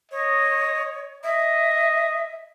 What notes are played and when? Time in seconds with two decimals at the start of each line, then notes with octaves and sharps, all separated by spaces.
0.11 C#5 D#5
1.23 D#5 E5